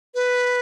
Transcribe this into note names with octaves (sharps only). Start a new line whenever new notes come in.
B4